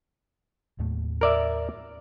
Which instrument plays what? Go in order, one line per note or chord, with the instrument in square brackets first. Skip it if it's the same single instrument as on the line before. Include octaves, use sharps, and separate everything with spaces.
[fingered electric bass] D#2 A2 A3
[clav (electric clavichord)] A#4 D5 E5